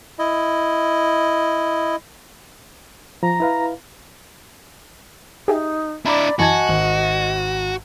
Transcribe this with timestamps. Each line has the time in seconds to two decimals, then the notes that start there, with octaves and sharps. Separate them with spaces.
0.19 E4 D#5
3.23 F3 A#5
3.40 E4 B4 F5
5.48 D#4 G4 G#4 E5
6.05 D4 E4 D5 A#5 B5 D6
6.39 F#2 E3 F#4 D#5 G#5 A5 G#6
6.67 G#1 F#7